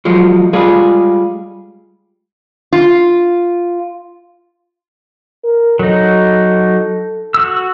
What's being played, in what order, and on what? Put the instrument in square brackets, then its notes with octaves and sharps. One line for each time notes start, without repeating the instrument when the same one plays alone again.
[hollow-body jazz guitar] F3 F#3 G#3
G3 G#3 F4 G#4
[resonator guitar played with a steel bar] F4
[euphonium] A#4
[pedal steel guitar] F#3 D#4 [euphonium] A4
[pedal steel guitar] F#4 E6